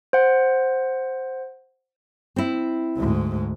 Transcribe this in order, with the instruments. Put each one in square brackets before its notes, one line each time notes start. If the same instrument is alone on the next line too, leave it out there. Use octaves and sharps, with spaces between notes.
[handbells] C5 F#5
[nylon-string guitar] C4 E4
[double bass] D2 G#2